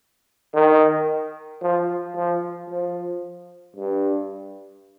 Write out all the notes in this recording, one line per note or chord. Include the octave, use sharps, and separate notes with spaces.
D#3
F3
F3
F3
G2